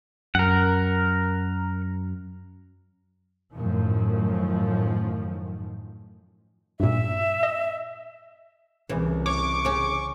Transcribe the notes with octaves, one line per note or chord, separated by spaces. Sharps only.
F#2 A#4 F#5
F#2 A2 D#3 F3
G2 A#2 E5
D#5
C2 C#3 E3
C#5 C#6 D6
C#3 C#4